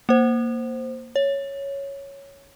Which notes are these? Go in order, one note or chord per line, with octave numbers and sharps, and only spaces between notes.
A#3 C5
C#5